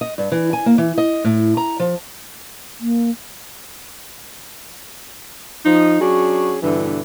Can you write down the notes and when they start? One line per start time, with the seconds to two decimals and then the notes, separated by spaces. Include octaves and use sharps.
0.01 D#5
0.18 G2
0.32 E3
0.53 G#5
0.66 A#3
0.78 E3
0.98 D#5
1.24 A2
1.57 A#5
1.80 F3
2.80 A#3
5.65 F3 D#4
6.00 F#3 C#4 D4 F#4 G#4
6.62 G2 B2 D3 E3